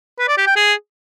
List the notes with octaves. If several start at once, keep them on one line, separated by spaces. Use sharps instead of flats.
B4
D5
G4
G5
G#4